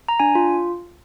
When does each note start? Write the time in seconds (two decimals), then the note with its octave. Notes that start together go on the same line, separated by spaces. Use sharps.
0.09 A#5
0.20 D4 G#5
0.35 F4